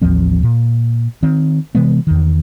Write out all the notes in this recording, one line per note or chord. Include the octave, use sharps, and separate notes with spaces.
A1 D#2 F3 C4
A#2
D#3 C4
C3 E3 G#3 B3
E2 D#3